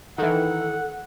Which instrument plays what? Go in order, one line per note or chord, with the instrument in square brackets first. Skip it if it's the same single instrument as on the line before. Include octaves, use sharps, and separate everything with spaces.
[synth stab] D#3 E3 [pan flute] A4 [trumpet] F#5